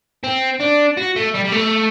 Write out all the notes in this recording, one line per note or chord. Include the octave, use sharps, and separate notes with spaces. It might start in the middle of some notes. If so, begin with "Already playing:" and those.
C4
D4
F#4
A3
G3
G3
A3